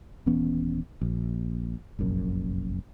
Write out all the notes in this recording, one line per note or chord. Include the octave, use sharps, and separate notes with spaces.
D#1 E3 B3 C#4
A#1
F1 A#1 F#2